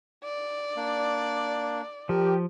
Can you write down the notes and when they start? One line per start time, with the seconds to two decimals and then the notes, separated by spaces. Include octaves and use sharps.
0.24 D5
0.76 A#3 D4
2.09 F3 G4 A#4